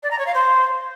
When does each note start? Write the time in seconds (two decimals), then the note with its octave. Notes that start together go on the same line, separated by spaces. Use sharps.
0.03 D5
0.11 A#5
0.19 C#5
0.26 F5
0.34 C5